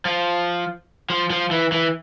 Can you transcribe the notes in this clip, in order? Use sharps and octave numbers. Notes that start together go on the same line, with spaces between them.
F3
F3
F3
E3
E3